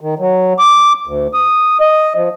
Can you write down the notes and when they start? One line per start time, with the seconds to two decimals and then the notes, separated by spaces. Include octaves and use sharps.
0.01 D#3
0.19 F#3
0.59 D6
1.07 D2
1.34 D#6
1.80 D#5
2.16 F3